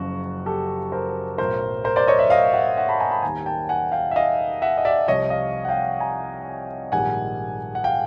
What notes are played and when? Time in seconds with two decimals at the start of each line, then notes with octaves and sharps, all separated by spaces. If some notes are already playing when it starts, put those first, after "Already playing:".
Already playing: F#1 F#2 C#3 F3 F#4
0.46 G4 A4
0.92 A#4 C5
1.38 B1 A2 F#3 A#4 C5
1.84 A#4 C5
1.96 C5 D5
2.07 C#5 D#5
2.19 D5 E5
2.30 D#5 F5
2.53 E5 F#5
2.77 E5 F#5
2.89 A5 B5
3.00 G#5 A#5
3.11 A5 B5
3.23 D#2 D#3 G3 G#5 A#5
3.46 G5 A5
3.69 F#5 G#5
3.92 F5 G5
4.11 E5
4.16 D#5 F5
4.62 E5 F#5
4.78 D#5
4.85 D5 E5
5.08 C2 C3 F3 C#5 D#5
5.30 D#5 F5
5.65 F#5
5.69 F5 G5
6.00 G#5 A#5
6.92 A#1 G#2 D#3 G3 F#5 G#5
7.75 F#5
7.84 F5 G5